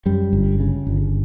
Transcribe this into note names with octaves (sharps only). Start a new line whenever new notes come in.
F#2 G3
G1
C#3
G1